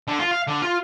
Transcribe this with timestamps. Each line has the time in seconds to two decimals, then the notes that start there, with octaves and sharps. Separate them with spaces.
0.08 D3
0.19 F4
0.31 F5
0.47 D3
0.62 F4